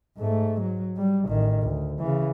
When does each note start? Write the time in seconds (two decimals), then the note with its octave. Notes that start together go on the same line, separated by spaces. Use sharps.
0.18 G#2 A3
0.61 F#3
0.97 G3
1.28 A1 D#3
1.63 D2
1.99 C#3 E3